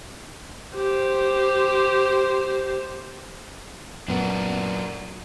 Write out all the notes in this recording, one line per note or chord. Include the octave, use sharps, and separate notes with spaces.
G4 C5
F#2 A#2 B3 D4 F#4 A#4